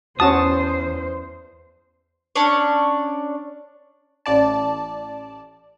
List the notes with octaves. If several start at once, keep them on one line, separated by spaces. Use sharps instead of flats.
E2 C#4 F#4 C5 A5 D#6
C#4 D4 C#5
A1 D5 A5